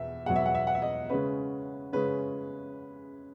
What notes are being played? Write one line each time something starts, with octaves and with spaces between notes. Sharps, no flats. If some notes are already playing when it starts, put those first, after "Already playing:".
Already playing: E2 B2 E5
E2 B2 F#3 F#5
E5
F#5
E5
F#5
E5
D#5
C#3 G#3 C#4 B4
C#3 G#3 C#4 B4